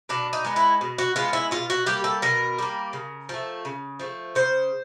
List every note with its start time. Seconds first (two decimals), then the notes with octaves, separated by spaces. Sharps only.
0.09 B2 D4
0.33 D#4
0.45 G#3 B3
0.56 E4
0.81 B2
0.98 F#4
1.16 G#3 B3 F4
1.33 E4
1.51 B2 F4
1.70 F#4
1.86 G3 A#3 G4
2.04 A4
2.22 B2 A#4
2.58 G3 A#3
2.93 C#3
3.29 F3 A3
3.65 C#3
3.99 F3 A3
4.35 C#3 C5